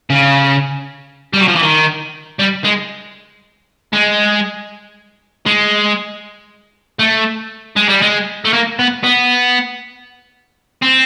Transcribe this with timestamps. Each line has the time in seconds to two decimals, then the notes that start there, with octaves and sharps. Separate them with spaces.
0.10 C#3
1.33 G3
1.40 F#3
1.48 F3
1.56 E3
1.63 D#3
2.39 G3
2.65 G#3
3.93 G#3
5.46 G#3
6.99 A3
7.77 G#3
7.89 G3
8.02 G#3
8.45 A3
8.53 A#3
8.79 B3
9.04 B3
10.82 C4